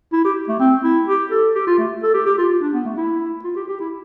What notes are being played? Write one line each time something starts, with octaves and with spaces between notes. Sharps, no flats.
E4
G4
A3
C4
E4
G4
A4
G4
F4
A3
A4
G4
G4
F4
F4
D4
B3
A3
E4
F4
G4
G4
E4